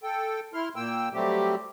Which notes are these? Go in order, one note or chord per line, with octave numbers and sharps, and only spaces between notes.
A4 G5
E4 C6 F6
A#2 A#3 G5 E6
F#3 G3 A3 C4 G4